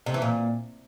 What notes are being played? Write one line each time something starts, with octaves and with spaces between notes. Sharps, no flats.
C3
E3
A#2